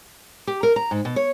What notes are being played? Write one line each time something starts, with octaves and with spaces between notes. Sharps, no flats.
G4
A#4
A#5
G#2
B2
C#5